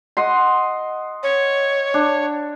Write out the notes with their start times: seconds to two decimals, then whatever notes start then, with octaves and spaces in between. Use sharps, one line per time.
0.17 D#5 F#5 C6
1.23 C#5
1.94 D4